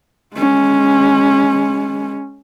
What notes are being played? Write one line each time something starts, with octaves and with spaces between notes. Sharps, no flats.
G#3 C#4